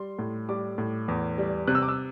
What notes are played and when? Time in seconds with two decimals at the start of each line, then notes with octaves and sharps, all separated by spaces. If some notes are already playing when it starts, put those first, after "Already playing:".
Already playing: G3 C6
0.19 A2
0.49 G3 D6
0.78 A2
1.08 E2
1.38 G3
1.67 C3 F#6
1.75 E6
1.82 D6
1.88 E6